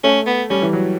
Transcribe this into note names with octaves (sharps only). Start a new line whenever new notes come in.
A3 C#4
B3
G3 C#4
E3
F#3